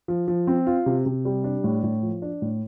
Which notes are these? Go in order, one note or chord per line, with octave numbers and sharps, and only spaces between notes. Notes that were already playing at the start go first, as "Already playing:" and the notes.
F3
F3
C4
F4
C3
C3
G3
D4
A2
A2
F3
D4
A2